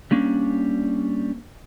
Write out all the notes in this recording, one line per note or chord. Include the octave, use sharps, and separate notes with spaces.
G3 A#3 C#4 D4